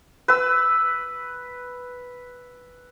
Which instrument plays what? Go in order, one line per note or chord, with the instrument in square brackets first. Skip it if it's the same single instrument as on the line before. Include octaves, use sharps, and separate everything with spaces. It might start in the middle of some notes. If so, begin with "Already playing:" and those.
[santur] B4 E6